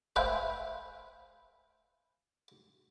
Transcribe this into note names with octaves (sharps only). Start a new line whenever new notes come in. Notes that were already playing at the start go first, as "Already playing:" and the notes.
B4 C5 E5 F5 G5 G#5